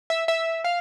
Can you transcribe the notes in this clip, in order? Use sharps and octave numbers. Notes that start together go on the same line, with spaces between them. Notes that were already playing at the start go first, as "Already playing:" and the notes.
E5
E5
F5